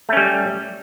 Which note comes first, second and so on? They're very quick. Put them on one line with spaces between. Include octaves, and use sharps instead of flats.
A3 C#4 G3